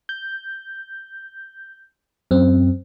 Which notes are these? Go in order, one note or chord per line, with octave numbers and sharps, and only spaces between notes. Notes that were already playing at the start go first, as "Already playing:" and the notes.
G6
F#2 C4